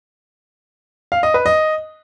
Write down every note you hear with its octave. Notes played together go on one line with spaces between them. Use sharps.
F5
D#5
B4
D#5